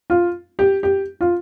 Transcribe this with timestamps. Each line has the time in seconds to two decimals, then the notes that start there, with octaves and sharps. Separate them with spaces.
0.10 F4
0.59 G4
0.83 G4
1.21 F4